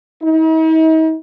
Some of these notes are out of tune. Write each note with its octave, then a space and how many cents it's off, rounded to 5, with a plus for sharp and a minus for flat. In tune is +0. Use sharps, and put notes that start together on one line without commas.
D#4 +45